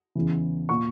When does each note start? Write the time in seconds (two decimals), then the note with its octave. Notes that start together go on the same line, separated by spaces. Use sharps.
0.15 E2 C#3 E3
0.69 A#2 C#6